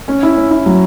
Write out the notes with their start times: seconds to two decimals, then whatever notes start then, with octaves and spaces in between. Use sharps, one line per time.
0.08 C#4
0.23 E4
0.37 C#4
0.51 E4
0.66 F#3